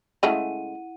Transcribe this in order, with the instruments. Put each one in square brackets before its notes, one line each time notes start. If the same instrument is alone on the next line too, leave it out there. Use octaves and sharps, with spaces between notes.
[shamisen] C#3 G#3 A3 [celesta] E4 F#5 D#7